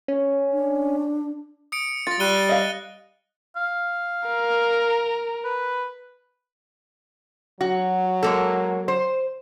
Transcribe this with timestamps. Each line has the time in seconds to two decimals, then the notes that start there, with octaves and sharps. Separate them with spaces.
0.08 C#4
0.53 D4
1.72 D#6 C#7 D7
2.07 F4 A6 A#6
2.20 G3 F#6 D#7 G7
2.49 D#5 F5
3.56 F5
4.29 A#4
5.44 B4
7.61 F#3 F#4
8.23 G#3 A#3 A4
8.88 C5